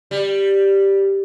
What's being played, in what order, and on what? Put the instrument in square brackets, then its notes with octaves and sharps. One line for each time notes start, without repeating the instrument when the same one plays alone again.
[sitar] G3